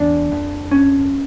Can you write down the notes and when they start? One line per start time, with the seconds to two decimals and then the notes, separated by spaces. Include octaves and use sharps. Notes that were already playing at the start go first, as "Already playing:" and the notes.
Already playing: E2 D4
0.32 F2
0.71 C#4